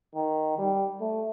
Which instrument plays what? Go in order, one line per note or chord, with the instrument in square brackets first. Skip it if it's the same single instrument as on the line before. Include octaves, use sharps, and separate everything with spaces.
[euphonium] D#3
G3
A3